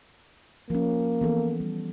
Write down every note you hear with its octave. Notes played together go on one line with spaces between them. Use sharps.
F3 A#3 C#4
E3 B3 A4
G3